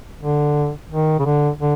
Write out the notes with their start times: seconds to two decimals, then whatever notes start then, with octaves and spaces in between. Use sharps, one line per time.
0.22 D3
0.90 D#3
1.19 C#3
1.26 D3
1.60 D3